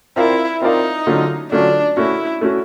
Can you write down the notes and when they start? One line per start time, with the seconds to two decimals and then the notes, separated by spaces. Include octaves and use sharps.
0.16 C4 E4 F4 A#4 D5 F5
0.62 C4 D#4 F4 A#4 D5 F5
1.07 D3 F#3 A3 C#4 F4
1.51 D3 F#3 A3 C#4 D4 F4
1.97 A3 C#4 E4 F#4
2.41 A3 C#4 F#4